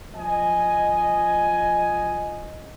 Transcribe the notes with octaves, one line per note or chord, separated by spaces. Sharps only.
F3 D#5 G#5